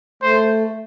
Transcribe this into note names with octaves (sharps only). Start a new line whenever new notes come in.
A3 C5